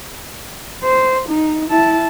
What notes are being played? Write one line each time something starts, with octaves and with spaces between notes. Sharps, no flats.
C5
D#4
E4 A5